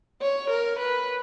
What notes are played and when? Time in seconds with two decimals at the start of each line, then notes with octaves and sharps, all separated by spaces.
0.22 C#5
0.50 A#4
0.79 B4